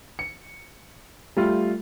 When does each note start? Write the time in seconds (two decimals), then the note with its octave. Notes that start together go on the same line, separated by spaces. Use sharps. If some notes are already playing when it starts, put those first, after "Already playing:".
0.19 C#7
1.37 G3 A3 F4